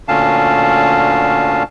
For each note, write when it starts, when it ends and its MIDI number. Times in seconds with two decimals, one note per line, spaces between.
0.08 1.63 38
0.08 1.63 46
0.08 1.63 50
0.08 1.63 61
0.08 1.63 77
0.08 1.63 81